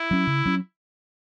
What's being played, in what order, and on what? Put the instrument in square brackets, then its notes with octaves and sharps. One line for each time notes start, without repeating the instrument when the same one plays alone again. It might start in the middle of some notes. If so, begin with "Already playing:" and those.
Already playing: [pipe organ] E4
[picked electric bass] F#3 C#4
C#3
F#3 C#4